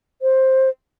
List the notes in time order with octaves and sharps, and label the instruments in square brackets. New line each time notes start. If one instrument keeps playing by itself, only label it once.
[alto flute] C5